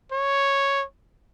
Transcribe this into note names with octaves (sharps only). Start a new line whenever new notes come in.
C#5